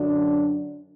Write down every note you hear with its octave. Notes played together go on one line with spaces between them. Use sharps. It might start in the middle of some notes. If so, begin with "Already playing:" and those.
Already playing: F#2 D3 F#3 D4